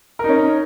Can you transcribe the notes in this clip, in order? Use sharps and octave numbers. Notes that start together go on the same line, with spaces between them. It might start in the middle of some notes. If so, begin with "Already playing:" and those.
C#4 D#4 A#4